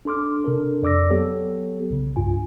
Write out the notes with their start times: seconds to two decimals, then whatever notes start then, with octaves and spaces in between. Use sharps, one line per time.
0.05 D4 A4 C6 D6 F6
0.44 C3 D4 A4 A#4
0.82 F2 D5 D6 E6 A#6
1.10 F#3 B3 G4 A4 C#5
1.90 B1 C#3
2.16 C2 G2 F4 G#5